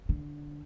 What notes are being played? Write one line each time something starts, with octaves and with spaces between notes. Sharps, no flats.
D3